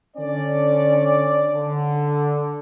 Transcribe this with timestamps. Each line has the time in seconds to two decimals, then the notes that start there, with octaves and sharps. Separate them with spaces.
0.17 D3 C#4 D4 D5
1.54 D3